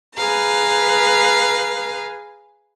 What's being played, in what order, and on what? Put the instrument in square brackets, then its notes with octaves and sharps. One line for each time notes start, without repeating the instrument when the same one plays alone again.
[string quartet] G#4 B4 F5 A#5